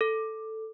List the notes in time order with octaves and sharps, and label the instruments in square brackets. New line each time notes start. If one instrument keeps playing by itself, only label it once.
[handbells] A4